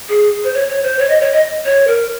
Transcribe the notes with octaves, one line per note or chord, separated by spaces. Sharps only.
G#4
C5
C#5
C#5
C5
C#5
D#5
C#5
D#5
C#5
A#4